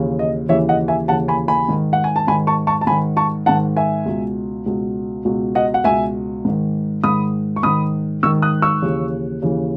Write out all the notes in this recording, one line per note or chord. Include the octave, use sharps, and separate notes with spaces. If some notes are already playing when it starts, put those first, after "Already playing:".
Already playing: D#2 C#3 E3
D#5
D#2 C#3 E3 C#5 E5
D#5 F#5
E5 G#5
D#2 C#3 E3 F#5 A5
G#5 B5
G#5 B5
G#2 D#3
F#5
G#5
A5
G#2 D#3 G#5 B5
A5 C#6
A5 C#6
A5
G#2 D#3 G#5 B5
A5 C#6
G#2 D#3 F#5 A5
E5 G#5
C#2 B2
C#2 B2
C#2 B2
D#5 F#5
F#5
C#2 B2 E5 G#5
G#2 D#3
G#2 D#3 B5 D#6
C#6
G#2 D#3 B5 D#6
G#2 D#3 C#6 E6
D#6 F#6
C#6 E6
D#2 C#3 E3
D#2 C#3 E3